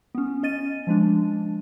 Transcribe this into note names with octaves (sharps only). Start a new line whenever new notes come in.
B3 C#4
C#4 D#5 A6 D#7
F3 G#3 D4